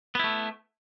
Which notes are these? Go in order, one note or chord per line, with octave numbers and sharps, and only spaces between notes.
A3 B3 E4